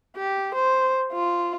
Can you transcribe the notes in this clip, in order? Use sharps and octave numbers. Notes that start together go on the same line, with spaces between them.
G4
C5
F4